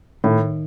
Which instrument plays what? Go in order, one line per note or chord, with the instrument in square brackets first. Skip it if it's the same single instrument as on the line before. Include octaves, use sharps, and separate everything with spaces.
[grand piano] A2 [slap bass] D#3